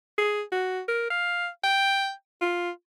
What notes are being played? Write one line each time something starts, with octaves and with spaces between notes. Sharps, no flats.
G#4
F#4
A#4
F5
G5
F4